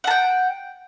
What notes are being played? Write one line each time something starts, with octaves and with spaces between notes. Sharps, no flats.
F#5 G5 A5